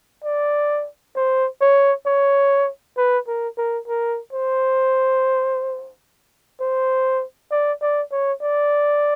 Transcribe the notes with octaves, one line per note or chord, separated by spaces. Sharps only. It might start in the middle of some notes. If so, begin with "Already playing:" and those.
D5
C5
C#5
C#5
B4
A#4
A#4
A#4
C5
C5
D5
D5
C#5
D5